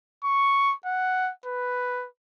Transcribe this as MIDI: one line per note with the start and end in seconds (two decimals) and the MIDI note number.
0.24 0.74 85
0.86 1.32 78
1.46 2.07 71